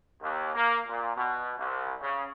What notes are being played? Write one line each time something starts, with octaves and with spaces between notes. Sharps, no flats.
D#2
A#3
A#2
B2
C2
C#3